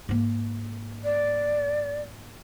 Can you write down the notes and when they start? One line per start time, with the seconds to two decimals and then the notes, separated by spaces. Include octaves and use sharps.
0.09 G#2 A#3
1.03 D5